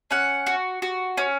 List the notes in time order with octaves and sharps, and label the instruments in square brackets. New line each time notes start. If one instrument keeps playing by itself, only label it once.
[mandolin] C#4 F#5
F#4
F#4
C#4